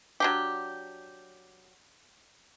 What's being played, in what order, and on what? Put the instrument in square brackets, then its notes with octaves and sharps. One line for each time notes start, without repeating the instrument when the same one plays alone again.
[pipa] F#3 D4 G4